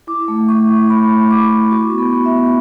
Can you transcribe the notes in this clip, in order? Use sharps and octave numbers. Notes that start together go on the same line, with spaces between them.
E4 D6
A3
A3 C#6
E4
E4 B5
A3
A3 D6
E4
F#4 C#6
B3
B5
B3
E5
B3